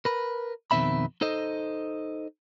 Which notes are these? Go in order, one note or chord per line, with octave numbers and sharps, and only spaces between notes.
A#4 B4
F2 B2 D#3 C4 E5 B5
D#4 A4 C5 D#5